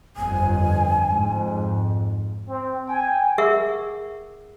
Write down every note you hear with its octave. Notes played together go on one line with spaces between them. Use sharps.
G1 F2 G#5
F2 G#2
C4
G5 G#5
G#4 A#4 E5 F#5 C#6